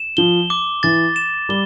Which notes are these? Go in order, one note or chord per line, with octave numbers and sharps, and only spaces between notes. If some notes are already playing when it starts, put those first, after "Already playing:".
Already playing: E7
F3 G7
D6
E3 A6
E7
G3 G7